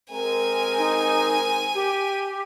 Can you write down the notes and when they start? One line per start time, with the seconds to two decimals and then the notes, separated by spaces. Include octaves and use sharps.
0.12 G#3 C4 A#4 G#5
0.78 D#4
1.75 G4